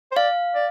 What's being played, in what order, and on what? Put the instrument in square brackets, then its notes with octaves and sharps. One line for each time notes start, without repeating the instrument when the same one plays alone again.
[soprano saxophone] C5
[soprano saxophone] D5 [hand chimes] F5
[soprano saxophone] D5